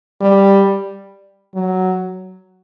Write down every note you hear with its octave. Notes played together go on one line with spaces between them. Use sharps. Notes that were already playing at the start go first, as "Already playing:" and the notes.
G3
F#3